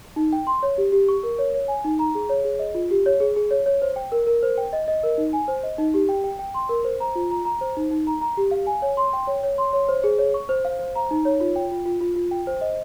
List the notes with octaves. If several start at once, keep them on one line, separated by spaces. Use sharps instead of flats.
D#4
G5
C6
C#5
G4
G4
C#6
A#4
C#5
C#5
G#5
D#4
A#5
G#4
C#5
G#4
D#5
F4
G4
C#5
G#4
G#4
C#5
C#5
C5
G5
A#4
A#4
C5
G5
D#5
D#5
A#4
D#4
G#5
C5
D#5
D#4
G4
G5
G5
G5
C6
A#4
C5
A#5
F4
A#5
A#5
C5
D#4
D#4
A#5
A#5
G4
F5
G#5
C#5
C6
G5
C#5
C#5
C6
C#5
C5
G#4
C#5
C#6
C5
F5
C5
A#5
D#4
C#5
F4
G5
F4
F4
F4
F4
G5
C5
D#5